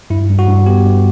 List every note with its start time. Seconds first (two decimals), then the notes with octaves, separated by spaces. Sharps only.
0.10 G2 E4
0.29 G2
0.39 F#4
0.48 G2
0.66 B3 G4
0.85 G2